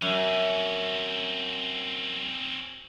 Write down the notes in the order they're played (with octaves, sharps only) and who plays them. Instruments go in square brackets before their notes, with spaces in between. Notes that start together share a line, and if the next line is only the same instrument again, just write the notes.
[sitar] F#2 [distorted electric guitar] C4 C#4